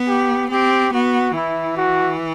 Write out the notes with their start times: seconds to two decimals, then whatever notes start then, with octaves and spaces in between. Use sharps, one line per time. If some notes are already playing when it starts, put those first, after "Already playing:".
Already playing: B3
0.08 G4
0.51 C4 G4
0.93 B3 F#4
1.35 E3 E4
1.77 F#4